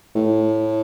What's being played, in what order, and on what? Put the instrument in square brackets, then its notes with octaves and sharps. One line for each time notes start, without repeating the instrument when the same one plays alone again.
[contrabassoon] A2